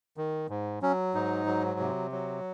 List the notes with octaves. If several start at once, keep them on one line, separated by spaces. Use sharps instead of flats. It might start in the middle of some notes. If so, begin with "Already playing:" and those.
D#3
G#2
F#3 C#4
G#2 D#4
F#3
C3
F#3